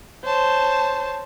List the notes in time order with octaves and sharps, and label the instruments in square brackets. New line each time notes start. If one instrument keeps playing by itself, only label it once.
[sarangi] C5 [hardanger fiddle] C#5 A5